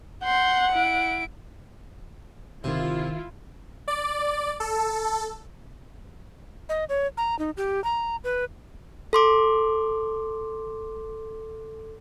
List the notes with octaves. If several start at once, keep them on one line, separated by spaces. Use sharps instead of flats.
F#5 C6 G6
E4 D7
G1 C3 D#3 E4 F4
D5
A4
D#5
C#5
A#5
D#4
G4
A#5
B4
A4 C6 D6